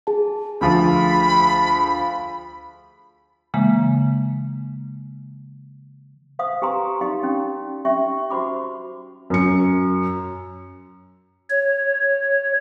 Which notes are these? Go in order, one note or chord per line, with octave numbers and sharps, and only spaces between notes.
G#4 A5
D2 F3 B5
C#3 E3 G#3 A#3
C5 F5 D#6
G4 B4 G#5 A#5 C6
D#4 G4 D5 F5 C6
C#4 D#4
C#4 G4 E5 C#6
F#4 C5 B5 D6
F#2 C#7
C#5